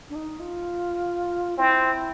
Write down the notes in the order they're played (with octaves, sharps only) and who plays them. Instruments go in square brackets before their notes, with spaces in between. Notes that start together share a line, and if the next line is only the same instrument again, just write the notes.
[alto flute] D4
D#4
F4
[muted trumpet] C4 [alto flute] E4